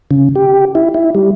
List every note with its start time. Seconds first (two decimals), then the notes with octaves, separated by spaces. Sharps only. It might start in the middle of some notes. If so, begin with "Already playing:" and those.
0.11 C#3
0.36 G4
0.75 E4
0.94 E4
1.15 G3